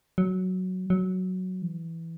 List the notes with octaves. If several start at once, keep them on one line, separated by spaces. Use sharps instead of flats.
F#3
F#3
E3